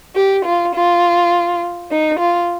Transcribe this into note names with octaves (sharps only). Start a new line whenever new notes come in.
G4
F4
F4
D#4
F4